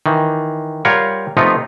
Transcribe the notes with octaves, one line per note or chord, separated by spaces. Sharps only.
D#3 E3
G3 F4 A#4 C#5 F5 F#5
C3 F3 A3 B3 D#4 F4